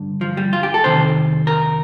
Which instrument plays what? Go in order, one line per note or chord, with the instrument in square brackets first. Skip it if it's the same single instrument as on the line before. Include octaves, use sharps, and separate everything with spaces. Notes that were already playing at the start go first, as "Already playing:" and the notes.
Already playing: [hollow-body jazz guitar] G2 D3
F3
G3
F4
G4
A4
F2 C3 D#3 C5
A#4